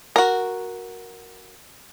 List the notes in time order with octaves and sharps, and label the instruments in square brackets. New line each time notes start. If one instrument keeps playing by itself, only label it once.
[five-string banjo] F#4 A#4